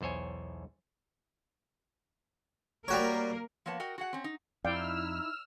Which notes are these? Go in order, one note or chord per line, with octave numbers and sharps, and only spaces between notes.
B1 E2 C5 C#5 G#5
G3 A#3 F#4 A#4 C#5
F3 A#3 B3 C#5 A5
F#4 A#4 D#5 G5
F#4 G#4 F#5
C4 C#4
D#4
F2 D#4 E4 D5 F5 G5 E6 F6